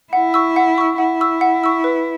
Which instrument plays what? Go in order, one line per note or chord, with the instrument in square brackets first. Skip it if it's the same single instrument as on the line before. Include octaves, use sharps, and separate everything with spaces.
[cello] E4 [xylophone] F#5
[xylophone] C#6 E6
F#5
C#6 E6
[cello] E4 [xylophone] F#5
[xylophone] C#6 E6
F#5
C#6 E6
B4